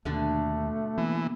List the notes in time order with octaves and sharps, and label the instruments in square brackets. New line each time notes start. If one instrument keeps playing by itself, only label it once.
[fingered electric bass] D#2 [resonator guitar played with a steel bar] B2 D3 D4 [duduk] A3
[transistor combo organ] E3 [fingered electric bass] A#3 B3